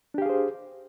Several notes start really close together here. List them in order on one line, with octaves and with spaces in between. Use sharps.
D4 G4 F5 G#4 C5